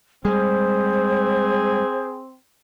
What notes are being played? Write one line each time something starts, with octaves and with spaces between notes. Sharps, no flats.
G3 G#3 C4 G#4 C5